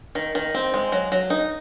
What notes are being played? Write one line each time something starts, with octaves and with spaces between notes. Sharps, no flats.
D#3
D#3
C4
G#3
F#3
F#3
D#4